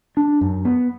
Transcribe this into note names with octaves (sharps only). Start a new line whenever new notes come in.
D4
F#2
B3